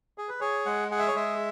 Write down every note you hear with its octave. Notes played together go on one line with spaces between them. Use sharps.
G#4
B4
G#4 C#5
G#3 F#5
G#4 F#5
E5
C#5
G#3 E5